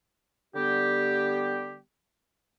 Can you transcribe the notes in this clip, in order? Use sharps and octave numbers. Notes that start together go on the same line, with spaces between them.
D3 G3 B3 G4